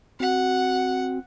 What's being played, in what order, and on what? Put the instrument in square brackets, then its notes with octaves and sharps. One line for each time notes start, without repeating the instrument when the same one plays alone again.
[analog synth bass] C4 [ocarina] F#4 [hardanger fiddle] F#5